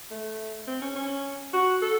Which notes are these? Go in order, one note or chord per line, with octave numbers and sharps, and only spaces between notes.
A3
C4
C#4
C#4
F#4
A4